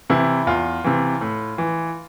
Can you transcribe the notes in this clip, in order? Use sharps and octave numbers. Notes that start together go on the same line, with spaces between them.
C3 E3 E4
E2 F4
C3 E3
A2
E3